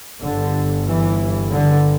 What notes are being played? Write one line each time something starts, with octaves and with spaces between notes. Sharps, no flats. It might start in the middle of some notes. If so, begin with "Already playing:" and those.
G1 G2 D3
E3
D3